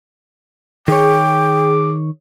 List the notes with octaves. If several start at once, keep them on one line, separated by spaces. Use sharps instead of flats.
D#3 G#4 C#5 G5 D6